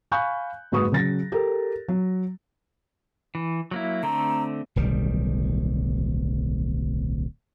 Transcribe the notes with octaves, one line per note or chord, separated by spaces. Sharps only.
F5 G#5 B5 C#6 F#6 G6
F#1 G#2 F#4 B4 C#6 D#6
C#3 F#3 A6 A#6
G4 A4 A#4
F#3
E3
F#3 A#3 E4
D3 A3 C4 A#5
D1 B1 D#3 G3